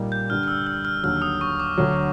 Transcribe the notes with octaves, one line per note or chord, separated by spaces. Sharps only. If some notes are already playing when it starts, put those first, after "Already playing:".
Already playing: A#2 G3 A#3 D#4
G6
G2 D3 G3 F6
F6
E6
F6
F6
D#2 D3 F#3 F6
D#6
C#6
D6
D2 D3 F#3